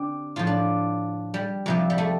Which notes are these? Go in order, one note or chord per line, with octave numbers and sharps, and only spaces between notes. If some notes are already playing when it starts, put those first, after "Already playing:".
Already playing: D3 C4 D4 G4
A2 F3 F4
D4
G3
F2 C3 F3
G3
A3